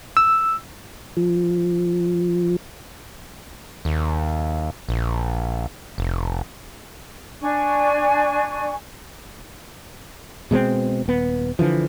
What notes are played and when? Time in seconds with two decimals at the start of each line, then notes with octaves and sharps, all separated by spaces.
0.17 E6
1.17 F3
3.85 D#2
4.89 A#1
5.98 F1
7.40 D4 G#5 C#6
10.51 B2 G#3 B3 C4
11.06 D#1 B3
11.59 D3 E3 F3